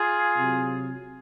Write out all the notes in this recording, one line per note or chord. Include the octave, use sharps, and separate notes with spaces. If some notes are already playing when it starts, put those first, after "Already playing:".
Already playing: F4 G#4
C3 F#3